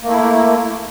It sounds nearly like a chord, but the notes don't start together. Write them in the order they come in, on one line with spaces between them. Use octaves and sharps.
A#3 A3 E4